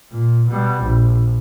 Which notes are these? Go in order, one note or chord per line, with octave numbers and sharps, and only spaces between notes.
A#2
B2 G3
A#1